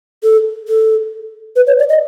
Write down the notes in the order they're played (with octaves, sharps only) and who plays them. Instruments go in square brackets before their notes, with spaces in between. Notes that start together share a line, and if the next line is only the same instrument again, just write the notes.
[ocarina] A4
A4
B4
C#5
D5
D#5